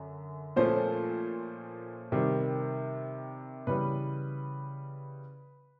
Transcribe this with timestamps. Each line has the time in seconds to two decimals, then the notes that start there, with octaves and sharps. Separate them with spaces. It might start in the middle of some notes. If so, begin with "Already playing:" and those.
Already playing: F#2 D3
0.56 A#2 F3 A3 C#4 C5
2.12 C3 D#3 G3
3.67 C#3 E3 G3 B4